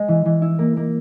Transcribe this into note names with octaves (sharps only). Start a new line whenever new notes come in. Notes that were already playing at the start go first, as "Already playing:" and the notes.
Already playing: G#3
E3
E3
E4
A#3
A#3